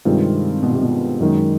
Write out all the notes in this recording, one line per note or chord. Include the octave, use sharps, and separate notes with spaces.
G2 C3 D#3 G#3 C4 F4
B2
C3
B2
F#2 D#3 G#3